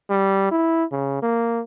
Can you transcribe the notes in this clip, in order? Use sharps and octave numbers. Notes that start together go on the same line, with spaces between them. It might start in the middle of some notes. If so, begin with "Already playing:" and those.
G3
E4
C#3
A#3